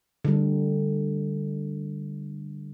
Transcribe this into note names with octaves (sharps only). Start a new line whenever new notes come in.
D3 G3